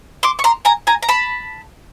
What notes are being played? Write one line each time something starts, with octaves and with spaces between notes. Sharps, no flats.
C6 D6
C#6
A#5 C6
G#5 A#5
G#5 A#5
A#5
A5 B5